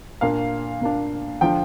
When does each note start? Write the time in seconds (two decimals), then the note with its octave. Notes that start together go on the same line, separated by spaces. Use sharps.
0.21 A#2 A#3 D4 F5
0.81 A#2 A#3 D4
1.41 D3 F3 D4 G5